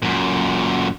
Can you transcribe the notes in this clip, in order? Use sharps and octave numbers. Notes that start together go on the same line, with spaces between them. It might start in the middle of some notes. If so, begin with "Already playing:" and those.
F#2 A#2